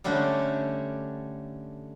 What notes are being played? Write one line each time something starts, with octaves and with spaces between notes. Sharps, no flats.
D3 G3 A3 C#4 D4